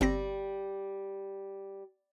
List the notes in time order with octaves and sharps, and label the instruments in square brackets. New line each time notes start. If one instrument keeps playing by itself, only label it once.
[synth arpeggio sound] G1 C4 A#6 [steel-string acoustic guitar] G3